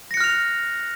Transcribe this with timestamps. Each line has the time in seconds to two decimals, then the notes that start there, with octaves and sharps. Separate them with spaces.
0.11 A#6
0.14 C#7
0.17 F#6
0.21 F6
0.24 F7